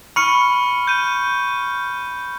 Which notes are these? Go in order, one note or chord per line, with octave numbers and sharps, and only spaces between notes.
B5 C#6 F6 C#7
G6 D#7